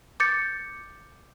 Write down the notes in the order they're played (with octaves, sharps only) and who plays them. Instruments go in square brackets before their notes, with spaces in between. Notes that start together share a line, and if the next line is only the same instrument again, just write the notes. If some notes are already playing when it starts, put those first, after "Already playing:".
[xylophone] D6 G6 A6 C#7